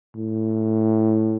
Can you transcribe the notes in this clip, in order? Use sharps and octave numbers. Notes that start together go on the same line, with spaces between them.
A2